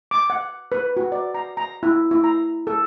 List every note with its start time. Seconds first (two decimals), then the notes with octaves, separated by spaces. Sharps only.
0.11 D6
0.30 F#5
0.72 B4
0.97 F#4
1.12 D5
1.34 A#5
1.57 A#5
1.83 E4
2.11 E4
2.24 A#5
2.67 A4